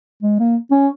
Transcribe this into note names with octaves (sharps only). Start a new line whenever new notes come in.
G#3
A#3
C#4